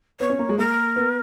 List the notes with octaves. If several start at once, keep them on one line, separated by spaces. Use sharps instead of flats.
B3 C#5
C#4
A#3
G#3
A#3 A#4
B3